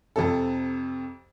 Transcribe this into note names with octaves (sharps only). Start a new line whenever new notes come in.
F2 C3 A4